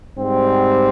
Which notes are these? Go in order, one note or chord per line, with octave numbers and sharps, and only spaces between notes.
G#2 G3 C4